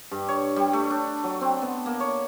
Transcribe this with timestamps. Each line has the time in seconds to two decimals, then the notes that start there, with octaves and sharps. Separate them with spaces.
0.11 G2
0.28 C#5
0.56 G3
0.73 A3
0.90 D4
1.24 F#3
1.41 C4
1.62 B3
1.86 A#3
2.00 C#5